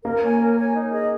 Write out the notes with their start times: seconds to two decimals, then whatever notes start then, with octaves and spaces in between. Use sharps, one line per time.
0.04 A#3 A#4
0.22 C#5 G#5
0.40 A#4
0.58 C#5 G#5
0.75 D#4
0.92 G#4 D#5